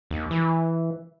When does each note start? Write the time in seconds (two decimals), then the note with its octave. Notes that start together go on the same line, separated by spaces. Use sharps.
0.11 D#2
0.31 E3